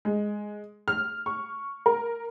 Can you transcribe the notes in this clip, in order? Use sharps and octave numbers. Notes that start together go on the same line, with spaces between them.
G#3
F6
C#6
A#4